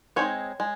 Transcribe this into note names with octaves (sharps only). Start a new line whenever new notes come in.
G#3 C4 D#4 C#5
G#3